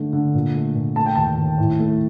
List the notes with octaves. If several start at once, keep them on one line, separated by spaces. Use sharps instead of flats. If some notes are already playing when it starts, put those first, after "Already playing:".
Already playing: D3 A3
D3
A#2
A3
A#2
A3 A5
G5
D#2 A5
D#2
A2
A3